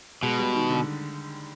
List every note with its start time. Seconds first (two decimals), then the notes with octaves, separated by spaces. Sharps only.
0.23 B2 G#3
0.39 G3
0.55 D#3
0.70 D3